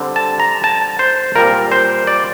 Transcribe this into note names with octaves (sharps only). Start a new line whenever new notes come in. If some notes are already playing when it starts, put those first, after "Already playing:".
Already playing: D3 G3 C4
A5
A#5
A5
C5
A#2 G3 C4 A#4
C5
D5